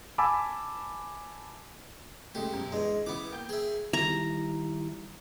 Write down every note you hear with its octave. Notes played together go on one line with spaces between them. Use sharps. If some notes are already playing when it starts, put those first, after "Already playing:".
G#5 A5 B5 D6 E6
C#3 G#3 A3 G4
F#2 B2
E3 G#3 D4
C#3 E3 B3 E4 D6
A#3 G5 G6
G#4 E5
D#3 G3 E4 A#5